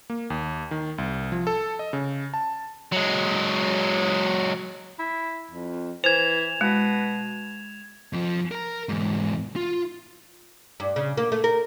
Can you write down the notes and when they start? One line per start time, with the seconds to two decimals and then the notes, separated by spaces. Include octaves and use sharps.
0.10 A#3
0.30 D#2
0.71 D#3
0.98 C2
1.32 F3
1.47 A4
1.79 D#5
1.93 C#3
2.34 A5
2.92 F#3 G#3
4.99 E4
5.51 F2
6.04 E3 C5 G#6 E7 F7
6.61 B2 G#3
8.13 F2 F3
8.51 A#4 A#5
8.89 E2 G#2
9.56 F4
10.80 G2
10.96 C#3
11.17 A#3
11.32 A3
11.44 A#4